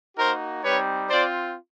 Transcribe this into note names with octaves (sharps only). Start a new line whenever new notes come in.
A#3 D#4 F#4 A#4 C5
G3 C4 D#4 B4 C#5
C4 F4 C5 D5